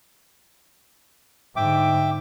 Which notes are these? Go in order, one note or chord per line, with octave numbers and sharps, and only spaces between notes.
G#2 D3 E5 G5 D6